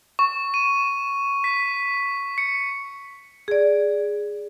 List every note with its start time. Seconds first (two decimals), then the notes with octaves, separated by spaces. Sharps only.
0.19 C#6
0.54 D#7
1.44 B6
2.38 C#7
3.48 G#4 D5